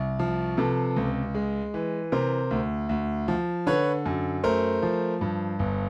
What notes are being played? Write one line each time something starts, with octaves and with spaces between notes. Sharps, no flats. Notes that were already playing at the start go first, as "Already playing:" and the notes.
Already playing: C2
F3
C3 A4 B4
C#2
G#3
E3
C3 A#4 C5
D2
D2
F3
D3 B4 C#5
F#2
A3 A#4 C5
F3
G2
G1